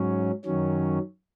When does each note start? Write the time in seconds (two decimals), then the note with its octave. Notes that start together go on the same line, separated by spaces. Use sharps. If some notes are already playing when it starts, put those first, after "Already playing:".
Already playing: G#2 F#3 C#4
0.45 F#2 D#3 F#3 C#4